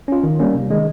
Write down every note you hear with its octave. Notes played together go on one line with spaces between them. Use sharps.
C#4 F4
D#3
G3 A#3 C#4
C3
D#3 G#3